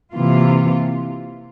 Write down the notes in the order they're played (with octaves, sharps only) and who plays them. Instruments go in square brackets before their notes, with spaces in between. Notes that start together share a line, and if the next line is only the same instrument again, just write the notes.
[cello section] C3 E3 A#3 F4